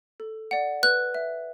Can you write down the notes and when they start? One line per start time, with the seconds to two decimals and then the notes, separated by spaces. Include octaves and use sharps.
0.20 A4
0.51 D5 F#5
0.83 B4 F#6
1.15 E5